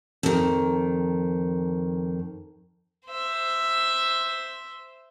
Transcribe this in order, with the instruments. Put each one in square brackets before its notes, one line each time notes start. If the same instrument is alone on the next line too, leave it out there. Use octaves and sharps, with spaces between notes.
[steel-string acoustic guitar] F2 D#3
[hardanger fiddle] C5 E5